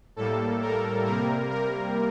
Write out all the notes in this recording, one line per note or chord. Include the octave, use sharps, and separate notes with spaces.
A2 G3 A#3 A4
A#4
C3 G3 A#3 A#4
A#4